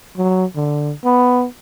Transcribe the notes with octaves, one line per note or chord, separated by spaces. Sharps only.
F#3
D3
B3